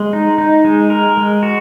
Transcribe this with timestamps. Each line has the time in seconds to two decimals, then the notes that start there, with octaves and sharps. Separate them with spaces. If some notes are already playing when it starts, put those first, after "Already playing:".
Already playing: G#3
0.13 D#4
0.38 D#4
0.65 G#3
0.90 A#4
1.17 G#3
1.43 F#4